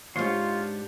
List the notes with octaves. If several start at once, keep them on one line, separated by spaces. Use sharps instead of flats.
D2 G#2 D4 F4 G4 C#5 C6